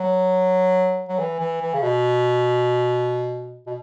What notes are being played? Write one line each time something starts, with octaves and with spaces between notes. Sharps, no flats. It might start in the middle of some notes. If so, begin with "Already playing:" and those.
Already playing: F#3
F#3
E3
E3
E3
C#3
B2
B2